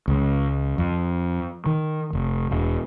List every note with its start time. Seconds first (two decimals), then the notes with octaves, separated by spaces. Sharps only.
0.08 C#2
0.78 F2
1.66 D#3
2.13 F1
2.51 E1